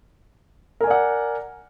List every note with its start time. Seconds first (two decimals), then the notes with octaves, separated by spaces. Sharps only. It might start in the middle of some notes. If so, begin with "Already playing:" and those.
0.81 A#4
0.84 G#5
0.87 D5
0.91 F#5